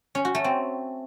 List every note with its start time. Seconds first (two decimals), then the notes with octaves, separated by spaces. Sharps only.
0.15 C#4
0.25 F#4
0.35 A3
0.44 C4